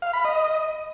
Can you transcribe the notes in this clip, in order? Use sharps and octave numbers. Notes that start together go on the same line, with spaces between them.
F5
B5
D#5